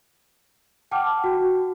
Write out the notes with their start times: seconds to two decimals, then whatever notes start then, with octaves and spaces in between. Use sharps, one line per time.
0.91 F#5 G5 A5 D6 F6
1.24 F#4